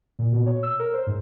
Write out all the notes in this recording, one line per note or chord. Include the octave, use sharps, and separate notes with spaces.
A#2
B2
C#5
E6
A#4
C5
G#2